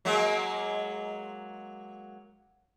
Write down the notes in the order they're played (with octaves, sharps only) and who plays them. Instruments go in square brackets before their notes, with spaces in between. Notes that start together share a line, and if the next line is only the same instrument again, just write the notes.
[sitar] F#3 G#3 A#3